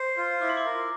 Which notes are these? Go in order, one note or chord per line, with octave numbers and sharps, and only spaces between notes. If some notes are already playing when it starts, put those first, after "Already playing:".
Already playing: C5
F4
E4 D6
C6
D6
A#4